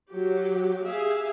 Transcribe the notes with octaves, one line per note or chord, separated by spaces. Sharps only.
F#3 G4
G4 G#4 E5 F5